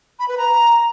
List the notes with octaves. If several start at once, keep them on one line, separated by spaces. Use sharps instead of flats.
B5
B4
A#5